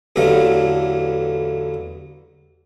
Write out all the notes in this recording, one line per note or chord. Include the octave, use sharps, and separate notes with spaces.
A1 E2 D3 F#3 A3 F5